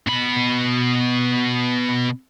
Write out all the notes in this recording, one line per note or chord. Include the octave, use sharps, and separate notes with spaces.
B2 B5